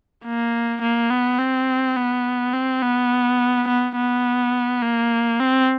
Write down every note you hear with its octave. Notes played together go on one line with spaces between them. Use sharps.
A#3
A#3
B3
C4
B3
C4
B3
B3
B3
A#3
C4